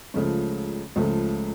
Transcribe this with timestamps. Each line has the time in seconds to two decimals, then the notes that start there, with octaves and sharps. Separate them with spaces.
0.14 C#2 C#3 F3 A3
0.96 C#2 C#3 F3 A3